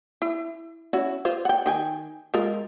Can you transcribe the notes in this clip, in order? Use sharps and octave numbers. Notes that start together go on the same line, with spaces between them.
E4
C#4 E4 F#4
F4 C5
F#5 G5
D#3 G5 G#5
G#3 F4 A#4